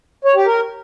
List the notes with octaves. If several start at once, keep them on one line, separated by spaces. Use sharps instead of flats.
C#5
G4
A#4